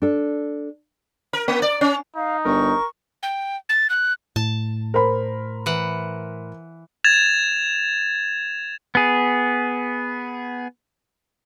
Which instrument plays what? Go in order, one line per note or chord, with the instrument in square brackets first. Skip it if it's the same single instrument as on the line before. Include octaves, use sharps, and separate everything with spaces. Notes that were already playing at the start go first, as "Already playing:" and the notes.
[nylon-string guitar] D4 A4
[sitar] A#4
A#3
D5
C#4
[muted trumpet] D#4 [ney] F5
[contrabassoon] G1 [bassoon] A#4 [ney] C#6
[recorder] G5
A6
F#6
[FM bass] A2 [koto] A5
[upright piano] A#4 C5 B5
[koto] E3 F#5
[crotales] G#6 A6 E7 F7
[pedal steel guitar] B3 G#4